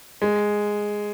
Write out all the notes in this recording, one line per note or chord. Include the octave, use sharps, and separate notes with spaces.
G#3